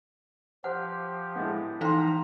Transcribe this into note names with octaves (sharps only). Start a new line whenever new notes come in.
F3 G4 C5 F#5 F6
A2 G#3 B3
E3 F3 D#4 F5 G5 A#5 C6